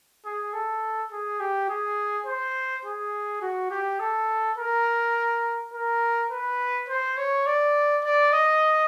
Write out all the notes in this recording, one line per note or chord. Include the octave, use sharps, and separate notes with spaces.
G#4
A4
G#4
G4
G#4
C5
G#4
F#4
G4
A4
A#4
A#4
B4
C5
C#5
D5
D5
D#5